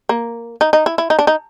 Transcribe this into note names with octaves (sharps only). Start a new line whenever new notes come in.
A#3
D#4
D#4
E4
E4
D#4
D4
D#4